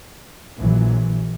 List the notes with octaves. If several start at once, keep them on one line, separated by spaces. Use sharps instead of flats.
A#1 E3 F#3